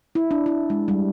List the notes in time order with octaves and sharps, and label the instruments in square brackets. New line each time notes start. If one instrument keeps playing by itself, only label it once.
[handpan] E4
D4
E4
G#3
G3